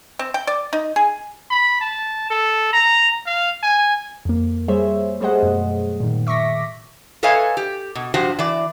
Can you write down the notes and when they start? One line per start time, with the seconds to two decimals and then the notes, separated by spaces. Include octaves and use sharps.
0.19 C4
0.34 G5
0.47 D5
0.73 D#4
0.96 G#4
1.51 B5
1.81 A5
2.30 A4
2.73 A#5
3.26 F5
3.63 G#5
4.25 F2 A#3
4.68 G3 G#4 C5 C#5 E5
5.20 G3 A3 G#4 C5 D#5 F#5
5.42 F#2 B2
6.00 A#2 D#3
6.27 E5 C#6 D6 A#6 B6
7.23 A4 B4 C#5 D#5 F5 G#5
7.57 G4
7.95 B2
8.14 G2 F3 F#4 G4 C5
8.39 E3 D5